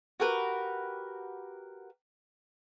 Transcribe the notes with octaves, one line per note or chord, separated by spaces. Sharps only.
F#4 G4 A#4 B4